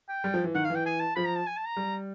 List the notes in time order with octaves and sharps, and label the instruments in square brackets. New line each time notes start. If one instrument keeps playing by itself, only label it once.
[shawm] G5
[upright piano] G3
F3
E3
[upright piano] D#3 [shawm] F#5
[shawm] F5
[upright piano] E3
[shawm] G5
G#5
A5
[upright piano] F3 [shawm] B5
[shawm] A#5
A5
G#5
A5
A#5
[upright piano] G3